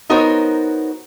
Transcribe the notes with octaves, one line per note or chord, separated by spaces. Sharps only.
B3 D#4 F#4 A#4 C5 C#5